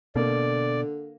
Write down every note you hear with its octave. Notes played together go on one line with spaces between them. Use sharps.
B2 D3 A#3 D5